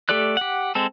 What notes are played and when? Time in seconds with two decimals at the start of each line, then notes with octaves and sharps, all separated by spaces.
0.09 A3 G4 A4 D5 F#6
0.37 G4 F#5
0.75 G#3 C4 A4